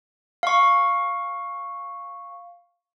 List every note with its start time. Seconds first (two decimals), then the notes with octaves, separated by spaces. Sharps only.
0.43 F5 C#6